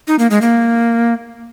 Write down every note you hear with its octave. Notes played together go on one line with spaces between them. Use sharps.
D#4
A#3
G#3
A#3